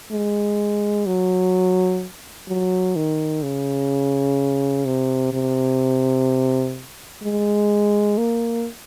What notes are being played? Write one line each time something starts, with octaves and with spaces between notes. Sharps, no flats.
G#3
F#3
F#3
D#3
C#3
C3
C3
G#3
A#3